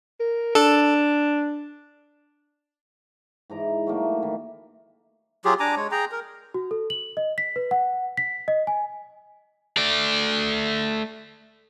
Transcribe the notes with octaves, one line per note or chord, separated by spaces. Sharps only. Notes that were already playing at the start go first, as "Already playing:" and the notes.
A#4
D4 A4
G#2 E3 A#5 D6
F#3 A3 A#3
D#3 E3
F#3 F4 G4 G#4
D4 G#5 A#5 D6
G#3 C#5
G#4 G5 A#5
A#4
F#4
A4
F#7
D#5
B6
B4
F#5
B6
D#5
G#5
A3 D5